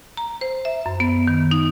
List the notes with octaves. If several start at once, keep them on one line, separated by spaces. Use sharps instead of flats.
A#5
C5
E5
F#2
B3
D#3
D#4